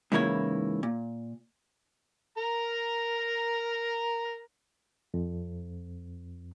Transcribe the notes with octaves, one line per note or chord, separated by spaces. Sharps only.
G#2 C#3 E3 A#3 E4 C#5
A#2
A#4 A#5
F2